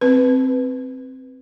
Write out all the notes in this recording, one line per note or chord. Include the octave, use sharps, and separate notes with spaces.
C4 B4